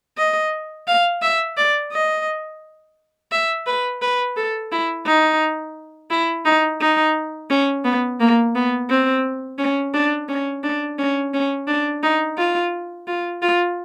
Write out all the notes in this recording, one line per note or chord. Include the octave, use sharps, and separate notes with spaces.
D#5
F5
E5
D5
D#5
E5
B4
B4
A4
E4
D#4
E4
D#4
D#4
C#4
B3
A#3
B3
C4
C#4
D4
C#4
D4
C#4
C#4
D4
D#4
F4
F4
F4